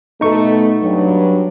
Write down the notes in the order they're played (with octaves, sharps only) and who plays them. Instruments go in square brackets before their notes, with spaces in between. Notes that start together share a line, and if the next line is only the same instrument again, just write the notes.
[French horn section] B2 A3 [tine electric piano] D#4 C#6
[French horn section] G2 F#3